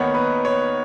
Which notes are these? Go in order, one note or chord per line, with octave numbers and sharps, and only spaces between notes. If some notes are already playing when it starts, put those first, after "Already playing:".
Already playing: D#2 D#3 B3 D#4 C#5 F#5
B4
C#5